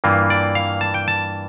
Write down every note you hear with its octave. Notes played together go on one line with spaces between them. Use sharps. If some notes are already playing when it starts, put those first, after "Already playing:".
G2 E3 A#3 F4
D5
F5
A5
G5
A5